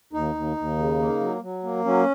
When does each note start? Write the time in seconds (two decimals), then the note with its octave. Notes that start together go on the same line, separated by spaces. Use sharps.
0.13 D#2 D#4
0.35 D#2
0.57 D#2
0.78 C#3
0.99 A#3
1.20 F#3
1.42 F#3
1.63 A#3
1.85 F#3 C#4